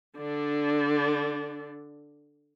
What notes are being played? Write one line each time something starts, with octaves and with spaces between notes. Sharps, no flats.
D3 D4